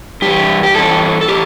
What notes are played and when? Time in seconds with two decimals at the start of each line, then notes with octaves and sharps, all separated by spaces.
0.22 G2 E3 G4
0.63 G4
0.75 G2 E3 A4
1.21 A4
1.28 A2 E3 G4